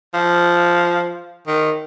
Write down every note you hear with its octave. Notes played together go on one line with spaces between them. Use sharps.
F3
D#3